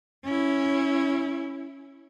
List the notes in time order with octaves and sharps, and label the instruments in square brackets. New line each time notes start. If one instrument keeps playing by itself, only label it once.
[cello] C#4 E4